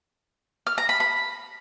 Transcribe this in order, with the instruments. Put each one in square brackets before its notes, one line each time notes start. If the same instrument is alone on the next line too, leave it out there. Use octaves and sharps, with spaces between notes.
[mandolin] F6
A#5
B5
B5